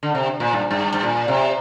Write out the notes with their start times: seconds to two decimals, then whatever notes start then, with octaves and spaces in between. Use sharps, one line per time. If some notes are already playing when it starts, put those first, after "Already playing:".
0.03 D3
0.15 C3
0.40 A#2
0.53 G2
0.71 G2
0.94 G2
1.03 A#2
1.28 C3